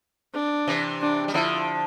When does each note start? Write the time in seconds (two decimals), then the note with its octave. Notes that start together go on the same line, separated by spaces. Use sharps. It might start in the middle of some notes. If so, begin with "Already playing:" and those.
0.34 D4
0.67 C3 E3
1.01 D4
1.28 G3
1.34 D3 F3 E4